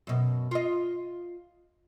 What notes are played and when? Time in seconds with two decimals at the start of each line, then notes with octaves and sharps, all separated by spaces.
0.07 F#2 B2
0.51 F4 D#5